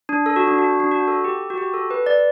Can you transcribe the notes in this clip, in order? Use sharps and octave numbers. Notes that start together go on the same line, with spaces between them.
D4
A4
F#4
D4
F#4
D4
F#4
A4
G4
F#4
G4
A4
B4
D5